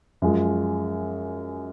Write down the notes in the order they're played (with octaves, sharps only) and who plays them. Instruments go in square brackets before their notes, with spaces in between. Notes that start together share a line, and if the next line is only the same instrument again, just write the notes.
[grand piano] F#2 F3 G#3